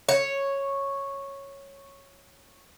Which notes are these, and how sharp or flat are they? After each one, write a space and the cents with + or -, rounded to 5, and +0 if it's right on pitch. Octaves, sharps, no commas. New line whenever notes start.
C#5 -5